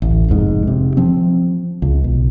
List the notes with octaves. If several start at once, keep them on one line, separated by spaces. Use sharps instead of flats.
A1 D2
F1 F2 G#2
C3
F3 C4
C#2
B1